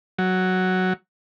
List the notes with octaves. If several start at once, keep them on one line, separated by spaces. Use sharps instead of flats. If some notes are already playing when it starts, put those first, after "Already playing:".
F#3